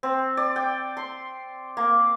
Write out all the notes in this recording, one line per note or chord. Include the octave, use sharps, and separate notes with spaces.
C4
D5
G5
C6
A#3